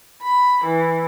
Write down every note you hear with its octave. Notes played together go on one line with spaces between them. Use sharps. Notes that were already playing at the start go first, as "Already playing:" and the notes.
B5
E3